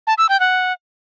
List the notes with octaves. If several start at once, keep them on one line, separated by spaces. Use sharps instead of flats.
A5
E6
G5
F#5